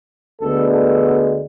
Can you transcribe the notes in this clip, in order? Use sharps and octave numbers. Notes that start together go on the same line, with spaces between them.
D2 D3 G#3 B3 A4
A4